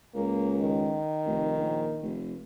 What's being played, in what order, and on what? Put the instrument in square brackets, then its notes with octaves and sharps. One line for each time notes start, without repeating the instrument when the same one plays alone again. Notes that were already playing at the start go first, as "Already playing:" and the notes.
[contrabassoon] C#2 [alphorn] A#3
[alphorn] D#3
[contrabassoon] F1
A#1
F1